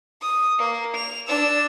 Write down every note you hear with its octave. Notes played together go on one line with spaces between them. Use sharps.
D#6
A#3
F7
D4 E6